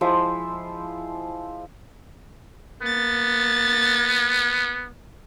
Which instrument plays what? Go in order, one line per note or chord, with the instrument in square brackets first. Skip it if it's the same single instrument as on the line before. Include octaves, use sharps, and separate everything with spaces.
[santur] F3 G#3 E4 C5
[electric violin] A#3 A6 [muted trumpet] B3